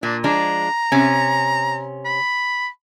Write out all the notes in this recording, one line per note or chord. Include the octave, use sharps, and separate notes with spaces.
A#2 D4
F3 G#3 D4 A#5
C3 C#4
B5